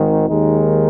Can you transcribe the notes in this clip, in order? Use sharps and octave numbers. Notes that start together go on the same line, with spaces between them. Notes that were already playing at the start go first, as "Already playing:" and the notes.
Already playing: G#1 G#2 D#3
D#2 D#3 G#3 D#4